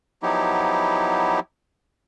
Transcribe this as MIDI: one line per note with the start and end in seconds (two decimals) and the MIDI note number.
0.23 1.40 53
0.23 1.40 54
0.23 1.40 59
0.23 1.40 63
0.23 1.40 64
0.23 1.40 67